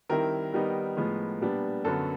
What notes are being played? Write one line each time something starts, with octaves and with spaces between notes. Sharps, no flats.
D#3 G3 C4 E4 A#4
D#3 G3 B3 D#4
A2 F3 G#3 B3
A#2 G3 B3 D4
F#2 D3 F#3 B3 A4